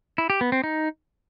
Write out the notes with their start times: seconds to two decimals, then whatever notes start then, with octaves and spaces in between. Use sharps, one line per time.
0.18 E4
0.30 G4
0.41 B3
0.52 C4
0.64 D#4